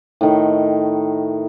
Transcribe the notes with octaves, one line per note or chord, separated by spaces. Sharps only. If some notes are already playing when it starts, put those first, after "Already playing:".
A2 D#3